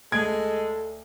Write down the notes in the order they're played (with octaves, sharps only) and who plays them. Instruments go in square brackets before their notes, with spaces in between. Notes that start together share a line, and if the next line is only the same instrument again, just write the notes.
[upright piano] D2 D7 [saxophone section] G#3 [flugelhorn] A4 [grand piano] G#6